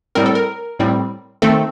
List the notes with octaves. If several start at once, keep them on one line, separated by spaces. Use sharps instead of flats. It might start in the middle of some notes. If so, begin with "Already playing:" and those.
A2 G3 C4 A#4
A4
A#4
A2 G3 C4
D#3 A3 C4 A4